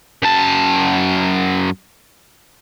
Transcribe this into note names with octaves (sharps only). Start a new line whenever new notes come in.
F#2 A5